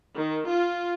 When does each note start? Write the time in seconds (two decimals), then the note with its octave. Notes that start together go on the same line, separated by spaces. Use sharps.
0.16 D#3
0.49 F4